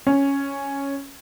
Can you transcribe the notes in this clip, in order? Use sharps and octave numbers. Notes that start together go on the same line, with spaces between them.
C#4